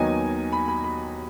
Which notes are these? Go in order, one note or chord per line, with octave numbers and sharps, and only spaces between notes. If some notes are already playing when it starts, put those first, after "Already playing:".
Already playing: D#2 D#3 F#3 B3 D#4 G#5
B5
B5
B5